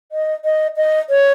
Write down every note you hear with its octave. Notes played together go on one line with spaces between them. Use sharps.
D#5
D#5
D#5
C#5